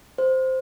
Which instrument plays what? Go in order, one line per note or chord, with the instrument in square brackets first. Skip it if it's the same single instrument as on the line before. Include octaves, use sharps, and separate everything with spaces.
[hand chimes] C5